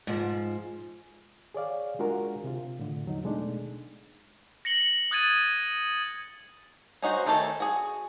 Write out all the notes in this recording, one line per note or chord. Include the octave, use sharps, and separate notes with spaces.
G#2 F3
G#4 C#5 D5 F5
G#3 D4 F4 F#4 G#4 A#4
C3 F4
A2 D3
E2 F#3 D#4
B2 G#3 A3 D4 D#4
A#6 C#7 F#7 G7
D#6 F#6 G#6 A6 D#7
C#4 D#4 F#4 C5
D#3 A3 C#4 D#4 A5
F#4 G#4